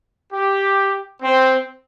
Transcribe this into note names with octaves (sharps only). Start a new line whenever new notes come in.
G4
C4